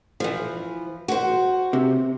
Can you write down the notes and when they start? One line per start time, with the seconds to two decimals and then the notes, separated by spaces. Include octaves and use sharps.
0.20 E3 F3
1.08 F#4 C5
1.73 C3